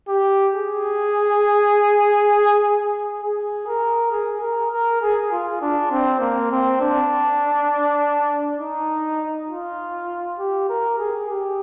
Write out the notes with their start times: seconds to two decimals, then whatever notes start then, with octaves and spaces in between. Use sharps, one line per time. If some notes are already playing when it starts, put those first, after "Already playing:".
0.09 G4
0.54 G#4
3.22 G#4
3.67 A#4
4.12 G#4
4.41 A#4
4.72 A#4
5.01 G#4
5.32 F4
5.62 D4
5.91 C4
6.20 A#3
6.51 C4
6.81 D4
8.61 D#4
9.49 F4
10.39 G4
10.70 A#4
10.98 G#4
11.29 G4